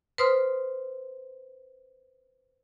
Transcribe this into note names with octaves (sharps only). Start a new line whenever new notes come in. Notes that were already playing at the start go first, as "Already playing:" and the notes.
B4 C5 C6 D#6 F6